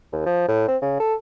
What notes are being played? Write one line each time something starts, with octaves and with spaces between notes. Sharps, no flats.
D#2
F3
A2
C4
C#3
A4